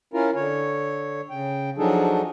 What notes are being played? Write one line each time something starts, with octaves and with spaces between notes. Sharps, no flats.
C#4 E4 F4 A#4
D3 C#5
C#3 G5
F3 F#3 D4 D#4 G#4 A4